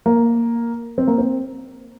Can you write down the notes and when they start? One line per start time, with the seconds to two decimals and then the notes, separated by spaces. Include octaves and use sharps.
0.06 A#3
0.98 C4
1.08 A#3
1.18 C4